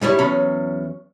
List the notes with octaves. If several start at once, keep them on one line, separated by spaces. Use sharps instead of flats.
G#2 G3 E4 C#5
E2 F#3 C#4 B5